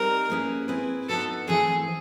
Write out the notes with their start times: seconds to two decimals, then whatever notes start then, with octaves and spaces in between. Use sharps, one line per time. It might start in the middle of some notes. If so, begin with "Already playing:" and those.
Already playing: G3 C4 D#4 A#4
0.30 A#3 C#4 E4 G#4 B4
0.68 C4 E4 G#4 B4
1.09 B3 D#4 F#4 A4 B4
1.48 E3 A3 C4 G#4